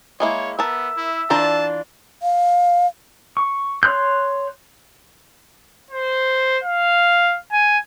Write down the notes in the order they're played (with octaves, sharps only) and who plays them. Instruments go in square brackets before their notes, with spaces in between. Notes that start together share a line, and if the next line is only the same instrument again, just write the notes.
[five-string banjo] G#3 A#3 E4 [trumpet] C#5
[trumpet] B3 [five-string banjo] A#4 A5 [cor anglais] E5
[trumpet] E4
[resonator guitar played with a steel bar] E3 D4 F4 [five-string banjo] A#4 C5 A#5 [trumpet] A5
[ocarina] F5
[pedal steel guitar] C#6
C#5 C6 F#6 G6
[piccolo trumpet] C5
F5
G#5